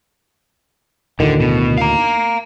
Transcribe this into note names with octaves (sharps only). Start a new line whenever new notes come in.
D2 A2 D3 D#3
B2
F5 A#5